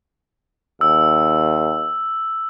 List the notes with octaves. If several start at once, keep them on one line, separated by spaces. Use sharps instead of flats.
D#2 E6